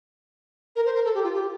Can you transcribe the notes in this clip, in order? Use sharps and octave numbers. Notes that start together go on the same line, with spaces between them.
A#4
C5
A#4
A4
G4
F4
G4